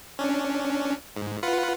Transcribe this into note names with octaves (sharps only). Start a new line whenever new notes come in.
C#4 D4
G#2
F4 B4 F#5